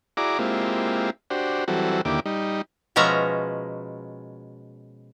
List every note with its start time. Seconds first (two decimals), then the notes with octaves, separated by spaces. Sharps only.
0.17 E4 F#4 G#4 D5 A#5 D6
0.39 G#3 A#3 C4 E4 F4 G4
1.30 D4 F#4 G4 C5
1.68 E3 F#3 G3 C4 F#4 A4
2.05 D#2 D3 A#3 E4 G4 D6
2.26 G3 D#4
2.96 B2 F3 G#3 C#4 E5 A#5